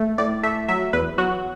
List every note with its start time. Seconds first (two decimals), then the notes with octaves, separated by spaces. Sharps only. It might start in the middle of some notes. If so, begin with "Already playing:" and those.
Already playing: A3
0.18 A2 D5
0.43 A3 E5
0.68 F#3 E5
0.93 E2 B4
1.18 F#3 F#4